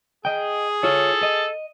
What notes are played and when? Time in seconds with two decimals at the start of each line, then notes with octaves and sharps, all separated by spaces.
0.25 G#4 D#5 G5
0.83 F4 A4 C#5
1.23 D#5